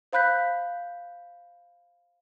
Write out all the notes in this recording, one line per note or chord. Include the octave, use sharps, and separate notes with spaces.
C5 F5 B5 F#6 G6 B6